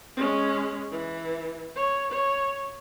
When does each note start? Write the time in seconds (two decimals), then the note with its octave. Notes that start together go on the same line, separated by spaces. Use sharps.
0.16 G#3 C#4
0.92 E3
1.76 C#5
2.11 C#5